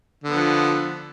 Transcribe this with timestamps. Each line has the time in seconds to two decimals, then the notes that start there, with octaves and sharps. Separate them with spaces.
0.24 D3
0.29 B3
0.34 F3